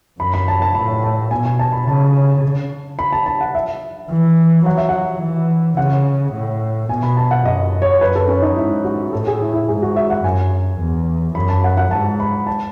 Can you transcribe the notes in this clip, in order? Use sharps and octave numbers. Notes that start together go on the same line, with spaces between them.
F#2 B5
B5
A5
A5
A2 B5
A5
B2 G#5
G#5
A5
B5
C#3 A5
B5
A5
A5
F#5
E5
E3
F#3 F#5
E5
F#5
E3
C#3 F#5
A2
B2 G#5
B5
A5
F#5
F#2 D#5
C#5
F#2 B4
A4
C#4
D#4
G#2 E4
F#4
A2 A4
G#4
E4
E4
G#2 G#4
F#4
E5
F#5
F#2 G#5
E2
F#2 B5
A5
F#5
F#5
G#2 A5
B5
A5